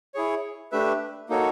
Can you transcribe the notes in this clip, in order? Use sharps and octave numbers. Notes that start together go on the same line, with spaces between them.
E4 G#4 C#5
A3 D4 G4 B4 E5
A#3 D#4 F#4 A4 C#5